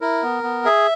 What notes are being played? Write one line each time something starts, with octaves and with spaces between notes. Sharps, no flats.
E4 A#4
B3
B3
G#4 E5